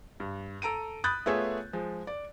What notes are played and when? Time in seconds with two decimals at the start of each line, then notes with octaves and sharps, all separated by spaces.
0.20 G2
0.62 A4 A#5 D7 D#7
1.04 B5 D#6 F#6 G6 A6
1.26 A3 B3 F4 G#4 C#5 E5
1.73 F3 G#3
2.07 D5